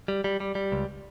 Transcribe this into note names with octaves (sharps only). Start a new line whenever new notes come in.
G3
G3
G3
G3
C#2